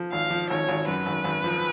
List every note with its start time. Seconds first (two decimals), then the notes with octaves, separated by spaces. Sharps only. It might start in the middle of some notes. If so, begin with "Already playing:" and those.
Already playing: F3
0.12 G#1 F5
0.30 F3
0.50 G#1 C#5
0.69 G#1
0.87 F#2 B4
1.06 G#1
1.24 G#1
1.44 F3